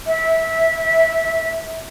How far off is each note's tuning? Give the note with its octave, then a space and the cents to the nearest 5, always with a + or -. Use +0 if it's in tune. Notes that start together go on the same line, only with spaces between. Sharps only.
E5 -15